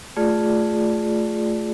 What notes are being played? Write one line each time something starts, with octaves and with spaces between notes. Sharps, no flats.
A3 F4 G#4 D5